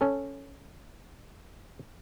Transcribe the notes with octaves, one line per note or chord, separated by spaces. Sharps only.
C#4 A4